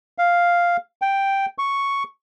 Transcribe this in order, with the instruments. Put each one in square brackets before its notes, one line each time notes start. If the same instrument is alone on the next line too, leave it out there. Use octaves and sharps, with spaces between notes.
[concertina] F5
G5
C#6